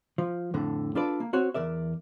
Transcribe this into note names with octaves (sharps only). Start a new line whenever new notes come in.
F3
F2 A2 D3
D4 F4 A4 B4 D5
A#3
C4 F#4 C#5
E2 A#4 D5 E5